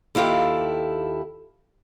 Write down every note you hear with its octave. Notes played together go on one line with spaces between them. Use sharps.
D#2 E4 F4 G4 A4